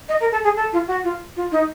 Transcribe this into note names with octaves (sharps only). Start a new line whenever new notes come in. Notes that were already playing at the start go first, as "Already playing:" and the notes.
D#5
A#4
A4
G#4
A4
F4
F#4
F4
F4
D#4